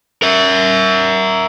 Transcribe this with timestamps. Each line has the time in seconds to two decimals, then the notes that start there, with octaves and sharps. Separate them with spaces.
0.22 A#4 E5